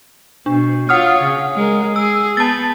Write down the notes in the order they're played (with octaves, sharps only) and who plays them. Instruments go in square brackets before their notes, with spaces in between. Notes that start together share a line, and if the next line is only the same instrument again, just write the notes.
[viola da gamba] B2 [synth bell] D4
[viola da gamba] F4 C#5 [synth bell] F#5 D#6 F6
[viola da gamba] C#3
G#3 A#4
[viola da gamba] G#4 [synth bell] E6
[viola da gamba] B3 [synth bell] A5 A6